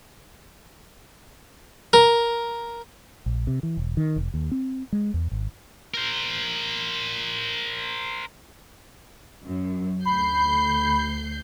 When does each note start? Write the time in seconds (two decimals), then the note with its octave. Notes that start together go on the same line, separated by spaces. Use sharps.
1.93 A#4
3.26 A#1
3.47 C3
3.63 E3
3.77 E1
3.97 D#3
4.16 F1
4.34 D#2
4.52 C4
4.93 G#3
5.14 E2
5.32 G#1
5.94 A#4 C5
9.45 F#2
10.05 D2 B5 G6 C7